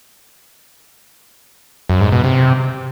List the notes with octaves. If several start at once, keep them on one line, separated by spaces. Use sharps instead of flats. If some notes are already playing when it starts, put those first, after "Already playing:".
F#2
G#2
B2
C3